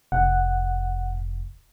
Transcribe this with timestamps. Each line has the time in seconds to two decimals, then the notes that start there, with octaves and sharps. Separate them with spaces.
0.12 F1 F#5